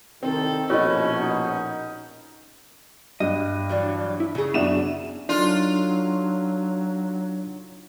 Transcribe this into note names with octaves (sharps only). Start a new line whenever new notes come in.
C2 D#3 C4 A4
A#1 B2 C#4 E4 F#4 C#5 D#5
D#4
G2 D#5
E3 F#3 D4
E4
C#3 G#4
F#2 B3 D4 E5 F#5 E7
F#3 D4 D#4 F4 A4